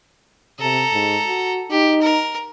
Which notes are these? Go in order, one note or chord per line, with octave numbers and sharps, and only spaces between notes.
C3 A4 A#5
G#2
F#4
D#4 G4
A#4